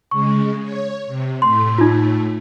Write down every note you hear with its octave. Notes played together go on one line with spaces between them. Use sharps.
C#3 G#3 C#6
C#5
C3
A2 A3 C6
D#4 F4